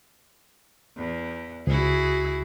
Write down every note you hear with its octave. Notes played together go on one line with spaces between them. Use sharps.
E2
C#2 E4 F#4 G#4